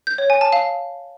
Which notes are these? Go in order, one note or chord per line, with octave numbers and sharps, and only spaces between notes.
G6
C#5
G#5
A5
F5